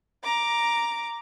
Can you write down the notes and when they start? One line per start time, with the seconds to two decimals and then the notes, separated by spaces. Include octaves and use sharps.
0.23 A#5 D6